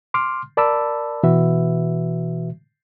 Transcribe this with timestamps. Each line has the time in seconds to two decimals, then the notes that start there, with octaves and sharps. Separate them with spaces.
0.14 C6 D6 F6
0.57 A#4 D5 A5 B5 D6 E6
1.23 B2 E3 F#4 B4 E5